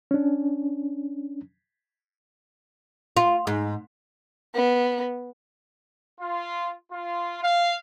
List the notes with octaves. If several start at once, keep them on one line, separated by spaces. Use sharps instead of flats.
C#4 D4
F4
G#2
B3
F4
F4
F5